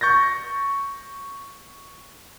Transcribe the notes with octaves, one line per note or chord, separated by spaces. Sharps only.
C#6 G6 A6 A#6